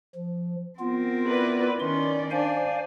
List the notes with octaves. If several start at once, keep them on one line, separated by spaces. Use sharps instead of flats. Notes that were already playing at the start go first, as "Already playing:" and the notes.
F3
B3 C4 F4 A#4
E4 B4 D5
D#3 C#4 D5 C6
D4 C5 F5 G#5